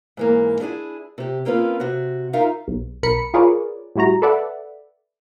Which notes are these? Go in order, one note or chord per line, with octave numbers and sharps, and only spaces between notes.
G#2 E3 A#3
D4 E4 G#4 G#5
C3 G4
A#3 C4 C#4 F4 B4
C3 F#4
D#4 F4 A#4 E5 F5
B1
B1 A#4 B5 C#7
F4 G#4 A#4 B4 C#5 D5
A2 G3 E4 F#4 A#5
A4 B4 D5 E5 F#5